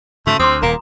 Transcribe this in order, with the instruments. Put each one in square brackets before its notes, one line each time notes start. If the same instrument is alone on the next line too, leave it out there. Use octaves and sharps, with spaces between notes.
[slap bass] G#2 C#3 [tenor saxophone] A3 [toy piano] F#4
[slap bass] D2 [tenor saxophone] C4 [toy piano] C6 D6 D#6
[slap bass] D#1 A#2 [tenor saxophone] A#3 [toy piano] A#5